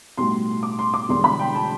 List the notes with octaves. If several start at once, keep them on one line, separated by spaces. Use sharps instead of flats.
B1 A2 G3 C6
D6
C6
D6
E1 E2 D3 G3 C6
B5
G5
A5